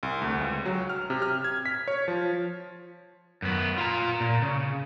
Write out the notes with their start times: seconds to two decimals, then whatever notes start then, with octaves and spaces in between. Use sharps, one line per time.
0.03 C2
0.21 D2
0.41 C#2
0.65 F#3
0.89 F6
1.10 C3
1.22 F6
1.44 G#6
1.66 B6
1.88 C#5
2.08 F3
3.42 F#2 B3
3.78 F4 A#5
4.20 A#2
4.42 C#3